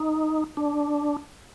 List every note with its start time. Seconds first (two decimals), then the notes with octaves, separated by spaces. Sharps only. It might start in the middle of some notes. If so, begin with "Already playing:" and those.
Already playing: D#4
0.57 D4